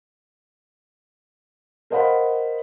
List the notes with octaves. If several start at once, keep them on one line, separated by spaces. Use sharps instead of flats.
A#4 C5 D#5 F5 F#5 B5